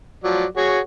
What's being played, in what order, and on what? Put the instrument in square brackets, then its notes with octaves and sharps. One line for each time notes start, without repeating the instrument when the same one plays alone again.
[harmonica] F3 F#3 D5
F#4 G#4 C#5